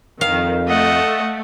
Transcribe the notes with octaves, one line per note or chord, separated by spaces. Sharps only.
F2 D#3 F5
A3 D#5 F#5